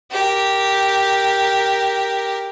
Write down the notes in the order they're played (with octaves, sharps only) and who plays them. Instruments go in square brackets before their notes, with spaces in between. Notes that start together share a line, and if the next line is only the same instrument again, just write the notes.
[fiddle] G4 A#4